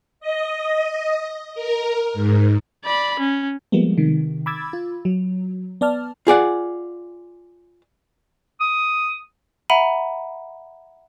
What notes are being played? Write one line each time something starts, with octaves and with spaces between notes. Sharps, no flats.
D#5
A#4
G#2
D5 B5
C#4
F3 G3 G#3 A#3 B3
C3 D#3
B5 D6 E6 G#6 A6
F4
F#3
B3 D5 A5 F6
F4 G#4 D5 F#5
D#6
E5 F#5 A#5 B5 D#7